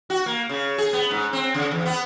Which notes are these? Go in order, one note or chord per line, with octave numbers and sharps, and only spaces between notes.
F#4
A#3
C#3
G#4
B3
G#2
C4
C#3
E2
B3